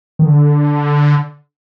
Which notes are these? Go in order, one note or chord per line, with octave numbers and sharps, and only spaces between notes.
D#3
D3